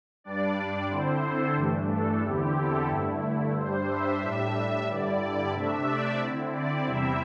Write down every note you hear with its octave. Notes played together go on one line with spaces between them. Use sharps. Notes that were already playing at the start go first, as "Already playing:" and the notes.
G2 G3 D4 D5
D5
D3 C4 E4 C5
A4
G2 E3 A3 D4 G4
A4
E2 D3 C4 E4 G4
A4
G2 D3 A3 E4
G2 G3 D4 C5
E5
A2 G3 D4 E5
G2 D3 G3 E4 D5
C3 A3 D4 E5
D5
D3 C4 E4
D5
E2 C3 G3 C4 E4 E5